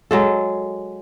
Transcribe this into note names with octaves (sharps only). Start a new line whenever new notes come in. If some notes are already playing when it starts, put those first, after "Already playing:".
F#3 G#3 A4